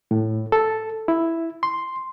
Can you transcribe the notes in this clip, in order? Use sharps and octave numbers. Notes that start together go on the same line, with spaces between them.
A2
A4
E4
C6